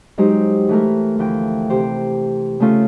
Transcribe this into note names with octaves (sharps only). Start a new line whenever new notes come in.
F#3 G#3 D#4 G4 C5
E3 A3 A#4
D2 E3 F3 G5
C3 G4 C5
C#3 A3 C#4 F4